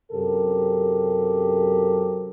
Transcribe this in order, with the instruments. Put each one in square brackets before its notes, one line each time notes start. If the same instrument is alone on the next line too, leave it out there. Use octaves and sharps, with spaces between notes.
[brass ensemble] F#2 C3 G4 A4 A#4